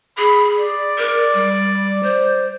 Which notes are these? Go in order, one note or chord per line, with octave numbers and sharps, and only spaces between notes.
G#4 B5
D5
A#4
G3
C5